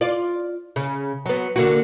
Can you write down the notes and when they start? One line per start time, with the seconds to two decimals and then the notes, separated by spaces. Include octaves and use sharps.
0.01 F4 D5
0.76 C#3
1.26 F#3 B3
1.56 D3 A#3 F#4